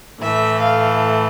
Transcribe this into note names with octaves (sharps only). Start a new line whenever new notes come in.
A2 E3 A3 E5
F5